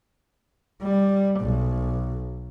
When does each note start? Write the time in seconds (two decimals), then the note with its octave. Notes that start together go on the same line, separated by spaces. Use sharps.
0.83 G3
1.41 B1